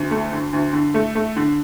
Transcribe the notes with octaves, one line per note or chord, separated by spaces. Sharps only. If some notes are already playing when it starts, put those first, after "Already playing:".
Already playing: D2
A3
D3
D2
D3
A3
A3
D3